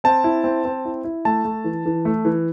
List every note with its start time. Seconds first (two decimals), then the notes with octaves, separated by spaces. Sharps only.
0.04 C4 A5
0.24 E4
0.44 C4
0.65 C4
0.85 E4
1.05 E4
1.25 A3 A5
1.45 A3
1.64 E3
1.86 E3
2.05 A3
2.25 E3